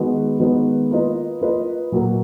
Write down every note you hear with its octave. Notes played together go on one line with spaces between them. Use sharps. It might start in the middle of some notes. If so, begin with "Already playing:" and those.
Already playing: D#3 G#3 B3 F#4 B4
D#3 G#3 B3 F#4 B4
A#3 F4 B4 D#5
A#3 F4 B4 D#5
A#2 F#3 A#3